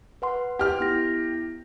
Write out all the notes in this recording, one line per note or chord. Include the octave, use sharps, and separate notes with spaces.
B4 F#5 C6
G4 F6
B3 E4 A#6